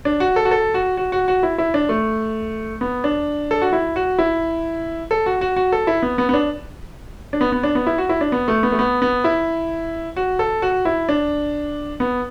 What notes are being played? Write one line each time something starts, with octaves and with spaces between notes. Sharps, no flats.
D4
F#4
A4
F#4
A4
F#4
F#4
F#4
F#4
E4
E4
D4
A3
B3
D4
A4
F#4
E4
F#4
E4
A4
F#4
F#4
F#4
A4
E4
B3
B3
B3
D4
D4
B3
B3
D4
B3
E4
F#4
E4
D4
B3
A3
B3
A3
B3
B3
E4
F#4
A4
F#4
E4
D4
B3